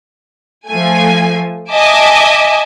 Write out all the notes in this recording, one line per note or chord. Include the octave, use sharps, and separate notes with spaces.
F3 A3 G#5
D#5 E5 G#5 A5 D6